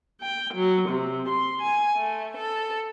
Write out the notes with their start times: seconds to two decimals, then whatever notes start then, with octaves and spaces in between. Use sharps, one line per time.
0.21 G5
0.54 F#3
0.89 C3
1.29 C6
1.62 G#5
1.96 A3
2.37 A4